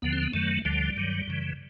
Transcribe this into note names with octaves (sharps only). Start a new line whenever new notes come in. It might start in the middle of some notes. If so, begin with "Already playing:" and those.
D#2 D3 F3 B3
C4
B3
F#2 D#3 F#3 A3
D2 D3 F3 G3
G2 D#3 F#3
F#2 C#3 E3